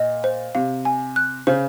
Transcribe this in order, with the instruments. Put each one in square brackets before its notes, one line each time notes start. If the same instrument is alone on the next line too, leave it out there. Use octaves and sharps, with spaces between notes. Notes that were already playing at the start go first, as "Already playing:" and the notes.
Already playing: [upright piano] A#2 [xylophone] D#5
[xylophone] C5
[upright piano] C3 [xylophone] F5
[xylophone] G#5
F#6
[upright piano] C#3 [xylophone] C5